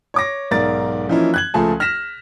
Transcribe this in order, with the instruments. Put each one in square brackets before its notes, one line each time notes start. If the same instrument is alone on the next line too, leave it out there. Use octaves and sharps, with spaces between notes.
[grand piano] C#5 D6 A#6
B1 G#2 A#4 D5 A6
E3 F3 A#3 C#4 D#4 E4
F#6 G#6 F#7
C#2 F3 A3 G#4 G#5 A5
F6 A#6 B6 E7